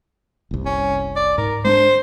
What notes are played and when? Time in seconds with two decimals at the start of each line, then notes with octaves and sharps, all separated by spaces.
0.51 F#1 C2
0.65 C#4
1.16 D5
1.38 G#2 A#4
1.65 G#3 C4 D4 C5